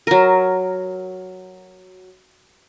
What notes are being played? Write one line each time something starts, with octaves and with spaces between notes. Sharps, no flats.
F#3 A#4